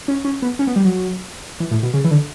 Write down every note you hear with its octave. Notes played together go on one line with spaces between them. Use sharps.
C#4
C#4
B3
C#4
B3
G3
F#3
E3
A2
B2
C#3
E3
D3